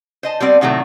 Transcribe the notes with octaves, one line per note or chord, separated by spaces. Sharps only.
C5 D#5 A5
G3 B3 C4 D5
A2 C3 D#3 F#3 A3